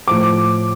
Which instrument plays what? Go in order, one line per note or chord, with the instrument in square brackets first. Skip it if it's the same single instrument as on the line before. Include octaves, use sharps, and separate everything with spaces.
[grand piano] A2 F3 D6